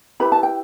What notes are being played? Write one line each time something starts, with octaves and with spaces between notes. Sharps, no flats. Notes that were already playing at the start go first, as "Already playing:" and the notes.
E4 G4 B4 B5
A5
G5